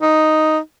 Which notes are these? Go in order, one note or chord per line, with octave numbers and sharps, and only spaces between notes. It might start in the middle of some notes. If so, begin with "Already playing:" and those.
D#4